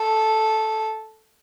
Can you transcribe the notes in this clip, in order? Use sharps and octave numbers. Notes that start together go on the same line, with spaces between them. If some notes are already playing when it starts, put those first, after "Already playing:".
Already playing: A4